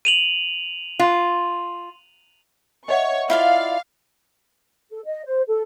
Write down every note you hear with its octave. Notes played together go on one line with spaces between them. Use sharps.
D#7 F7 F#7
F4
C#5 D#5 E5 F#5 C#6
E4 F4 D5 F5
A4
D#5
C5
A4